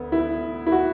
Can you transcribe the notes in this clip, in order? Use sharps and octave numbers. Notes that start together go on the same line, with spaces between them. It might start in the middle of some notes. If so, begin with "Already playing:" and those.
Already playing: D2 B3
E4
E4
F#4